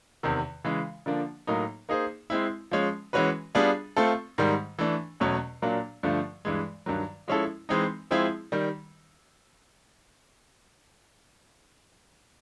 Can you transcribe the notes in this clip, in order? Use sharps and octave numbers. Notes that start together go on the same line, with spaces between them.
E2 C3 D#3
C#3 E3 G#3
D3 F3 A#3 D4
A2 F#3 A#3 D#4
A#3 D#4 G#4 C5
G#3 C4 E4
F3 G#3 C#4
E3 G#3 C#4 F#4 B4
G3 B3 D4 F4 G#4
A3 C4 F4 A4
G#2 D#3 G3
E3 A3 D4
E2 B2 F#3 A3 C#4
A#2 F#3 A#3 D4
G2 D3 F3 A3
G2 E3 G#3
G2 D#3 F#3
F3 G#3 C#4 E4 A4
E3 G#3 C4 D#4
F3 G#3 C4 E4 G#4
D#3 G3